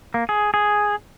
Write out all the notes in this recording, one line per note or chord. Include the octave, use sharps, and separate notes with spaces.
A#3
G#4
G#4